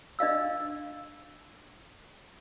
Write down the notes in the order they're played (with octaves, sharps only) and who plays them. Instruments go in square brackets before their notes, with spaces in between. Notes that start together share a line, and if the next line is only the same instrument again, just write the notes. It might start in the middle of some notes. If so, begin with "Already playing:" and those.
[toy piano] D4 D#5 F5 E6